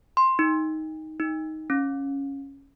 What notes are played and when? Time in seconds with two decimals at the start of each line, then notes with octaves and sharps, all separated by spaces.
0.17 C6
0.39 D#4
1.20 D#4
1.70 C#4